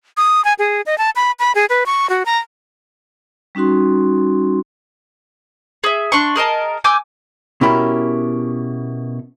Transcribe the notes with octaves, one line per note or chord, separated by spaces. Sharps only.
D#6
G#5
G#4
D#5
A5
B5
B5
G#4
B4
C#6
F#4
A#5
G3 C#4 D#4 F#4 C6
G#4 E5
D4 C6 C#6
G#4 A#4 D#5 A5
G#5 D6 E6 G6
B2 C#4 E4 G4 A#4 B5